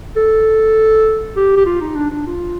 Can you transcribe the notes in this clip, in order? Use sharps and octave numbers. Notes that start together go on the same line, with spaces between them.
A4
G4
G4
F4
D#4
D4
D4
F4